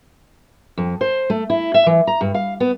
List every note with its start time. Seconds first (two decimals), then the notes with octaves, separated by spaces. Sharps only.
0.78 F2
1.01 C5
1.30 A3
1.50 E4
1.74 E5
1.86 E3
2.07 A#5
2.21 G2
2.34 F5
2.60 B3